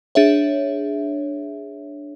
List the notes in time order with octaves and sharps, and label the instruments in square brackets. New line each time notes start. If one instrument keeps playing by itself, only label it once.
[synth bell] D4 G#4 C#5 E5